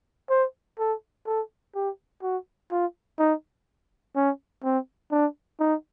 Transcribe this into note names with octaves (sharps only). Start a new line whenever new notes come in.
C5
A4
A4
G4
F#4
F4
D#4
C#4
C4
D4
D#4